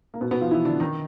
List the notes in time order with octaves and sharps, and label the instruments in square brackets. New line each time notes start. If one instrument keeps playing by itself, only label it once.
[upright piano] A#3
B2 B3
B2 B3
F3 F4
E3 E4
D3 D4
D#3 D#4